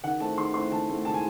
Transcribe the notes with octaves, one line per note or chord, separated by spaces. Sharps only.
D#3 F#5
A3 C4 A5
D#3 C6
A3 C4 C6
D#3 A5
A3 C4
D#3 A5
G#5